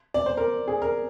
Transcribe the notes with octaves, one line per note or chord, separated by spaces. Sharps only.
D5
C5
A#4
G#4
A#4